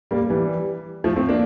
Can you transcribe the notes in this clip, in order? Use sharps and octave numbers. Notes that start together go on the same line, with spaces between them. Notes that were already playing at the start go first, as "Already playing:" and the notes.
G3 A#3
E3 G3
F3 A3
A3 C4
A#3 D4